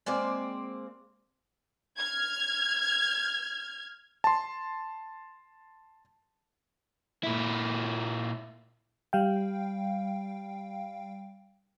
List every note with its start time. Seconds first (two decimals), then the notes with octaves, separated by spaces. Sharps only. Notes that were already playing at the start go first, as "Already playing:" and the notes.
0.06 G#3 A#3 C4 D5
1.98 F6 G#6
4.24 A5 C6
7.23 A#2 E4
9.13 G3 F5 G5